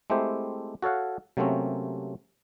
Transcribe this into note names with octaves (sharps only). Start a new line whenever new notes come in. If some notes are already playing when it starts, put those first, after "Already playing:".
G#3 A3 C4 E4 G4 C5
F#4 A4 C#5 F5 F#5
C3 F#3 A3 A#3 C4 C#4